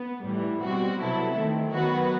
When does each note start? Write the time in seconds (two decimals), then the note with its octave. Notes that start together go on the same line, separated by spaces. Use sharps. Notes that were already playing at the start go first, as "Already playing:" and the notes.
Already playing: B3
0.25 A2 E3 G3
0.62 B2 G3 C4 F#4
0.99 C3 F#3 B3 E4 A4
1.36 D#3 A3 C4
1.73 D#3 F#3 B3 F#4 B4